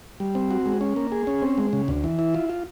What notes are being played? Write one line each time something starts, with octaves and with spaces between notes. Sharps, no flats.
G3
C4
F#4
G#3
C#4
A#3
G#4
C#4
C4
G#3
C#3
D2
E3
E4
F4
F4